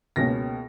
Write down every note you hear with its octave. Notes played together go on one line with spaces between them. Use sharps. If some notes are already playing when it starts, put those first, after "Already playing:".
C#2 B2 A#3 C#4 A#6